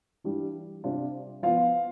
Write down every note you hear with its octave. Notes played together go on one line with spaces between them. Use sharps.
E3 G3 D4 F4
C3 G3 D4 F4
F3 B3 F4 F5